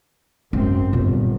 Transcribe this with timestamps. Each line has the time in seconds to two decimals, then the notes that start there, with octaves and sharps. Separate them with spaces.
0.53 G#1 F#2 C4 C#4
0.93 G1 A#2